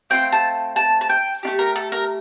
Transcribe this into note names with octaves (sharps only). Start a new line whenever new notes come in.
A3 C4 F4 G5
A5
A5
A5
G5
A3 D4 G4
A#4
A4
A#4